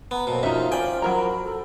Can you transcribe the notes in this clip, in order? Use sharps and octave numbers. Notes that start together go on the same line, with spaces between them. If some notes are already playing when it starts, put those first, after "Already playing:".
B3 A#5
B2 F#3 A#3 C4
F#2 F3 D#4 F4 E5
D5 G5 G#5
F#3 A#4 A#5 B5
A4